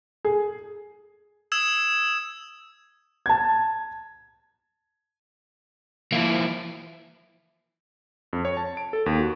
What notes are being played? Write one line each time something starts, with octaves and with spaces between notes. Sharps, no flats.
G#4
D#6 E6 G#6 E7
A5 G#6
E3 F3 A#3 E4
F2
C#5
A5
D7
A4
D#2
F#4